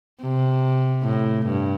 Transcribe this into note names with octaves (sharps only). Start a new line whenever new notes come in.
C3
A2
G2